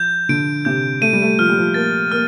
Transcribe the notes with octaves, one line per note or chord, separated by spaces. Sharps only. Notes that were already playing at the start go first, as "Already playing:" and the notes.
Already playing: F3 G6
D3 D7
C3 G6
A3 D#7
G3
A3
F3 F6
G3
F3
A#3 A6
A#3 F6